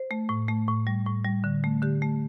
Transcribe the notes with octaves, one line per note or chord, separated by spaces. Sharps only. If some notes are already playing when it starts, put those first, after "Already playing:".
Already playing: C5
A3
A2
A3
A2
G3
A2
G3
D3
A3
D3 G4
A3